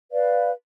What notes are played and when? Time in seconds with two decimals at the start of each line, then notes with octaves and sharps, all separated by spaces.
0.12 B4 D5 F5